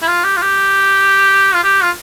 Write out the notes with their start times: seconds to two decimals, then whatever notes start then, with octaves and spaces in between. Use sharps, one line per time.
0.02 E4
0.07 F4
0.24 G4
0.37 F4
0.42 G4
1.54 F4
1.64 G4
1.83 F4